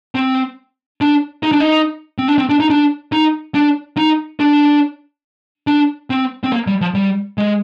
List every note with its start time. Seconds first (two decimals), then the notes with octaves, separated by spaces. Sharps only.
0.15 C4
1.01 D4
1.43 D#4
1.52 D4
1.60 D#4
2.18 C4
2.28 D4
2.38 C4
2.49 D4
2.60 D#4
2.70 D4
3.12 D#4
3.54 D4
3.97 D#4
4.40 D4
5.67 D4
6.10 C4
6.44 C4
6.52 A#3
6.67 G3
6.81 F3
6.95 G3
7.38 G#3